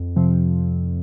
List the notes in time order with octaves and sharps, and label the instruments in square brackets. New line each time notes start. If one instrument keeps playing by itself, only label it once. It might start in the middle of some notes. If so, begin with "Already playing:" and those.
Already playing: [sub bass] F2
[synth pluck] C3 F3 C4